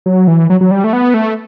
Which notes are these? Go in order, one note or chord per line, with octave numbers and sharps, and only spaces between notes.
F#3
E3
F#3
F#3
G3
A3
B3
A3